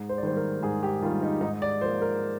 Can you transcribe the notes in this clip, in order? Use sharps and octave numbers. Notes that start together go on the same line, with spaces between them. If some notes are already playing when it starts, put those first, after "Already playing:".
Already playing: G#2
C5
D5
D#3 G3 A#3 C5
A#4
G#2 G#4
G4
D#3 G3 A#3 F4
D#4
G#2 D#4
D5
F3 A#3 C5
A#4